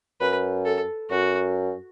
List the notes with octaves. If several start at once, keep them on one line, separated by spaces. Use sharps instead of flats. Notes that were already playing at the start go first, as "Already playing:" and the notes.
F#2 B4
A4
F#2 F#4